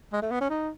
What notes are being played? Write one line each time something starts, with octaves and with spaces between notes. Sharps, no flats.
G#3
A3
B3
C#4
D#4